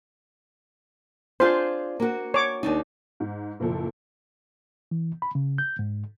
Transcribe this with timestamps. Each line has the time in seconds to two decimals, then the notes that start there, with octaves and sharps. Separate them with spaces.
1.40 D4 F4 G#4 C5
2.00 A#3 F#4
2.34 C#5 D6
2.63 D#2 D4 D#4
3.20 G#2
3.60 F#1 A#2 F3 A4
4.91 E3
5.22 B5
5.35 C#3
5.58 G6
5.79 G#2